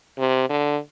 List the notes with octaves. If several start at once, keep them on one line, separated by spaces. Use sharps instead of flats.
C3
D3